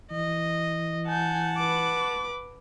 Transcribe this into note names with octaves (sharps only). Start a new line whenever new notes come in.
E3 D#5
F#5 G#5 A5 G6
B4 D6